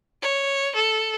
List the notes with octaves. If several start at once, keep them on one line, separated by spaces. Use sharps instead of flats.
C#5
A4